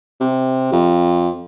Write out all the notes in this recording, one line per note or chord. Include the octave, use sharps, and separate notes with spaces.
C3
F2